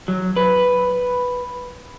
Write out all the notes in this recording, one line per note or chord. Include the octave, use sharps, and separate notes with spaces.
F#3
B4